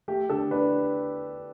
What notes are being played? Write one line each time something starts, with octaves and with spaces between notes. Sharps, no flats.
A3 G4
D3 A4
D4 B4